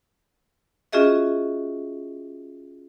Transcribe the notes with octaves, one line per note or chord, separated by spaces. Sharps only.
C#4 F4 F#4 G#4 D#5 E5